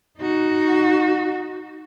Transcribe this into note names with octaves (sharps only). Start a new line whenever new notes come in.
D#4 F#4